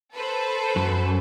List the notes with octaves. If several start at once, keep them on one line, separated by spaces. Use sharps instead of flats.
A4 B4 C5
F#2